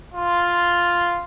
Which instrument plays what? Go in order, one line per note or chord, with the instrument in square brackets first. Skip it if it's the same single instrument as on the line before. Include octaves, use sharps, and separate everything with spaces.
[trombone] F4